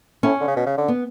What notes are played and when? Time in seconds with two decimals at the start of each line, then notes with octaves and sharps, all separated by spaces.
0.23 A2 C#4
0.40 D3
0.48 C#3
0.56 B2
0.66 C#3
0.77 D3
0.88 B3